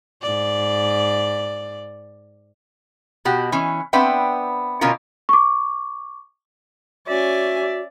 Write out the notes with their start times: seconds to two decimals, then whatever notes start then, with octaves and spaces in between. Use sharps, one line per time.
0.22 G#2 D5
3.25 B2 F#4 G4
3.52 E3 C#4
3.93 B3 C4 D4 B4 E5 G5
4.81 B2 D3 C#4 F4 A#4
5.29 C#6 D6
7.08 C#4 F#4 D5 E5 G#5